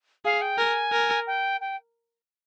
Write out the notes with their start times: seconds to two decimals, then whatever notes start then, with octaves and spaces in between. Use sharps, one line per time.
0.25 G#4 F5
0.41 G5
0.58 A#4 G#5
0.92 A#4
1.27 G5
1.61 G5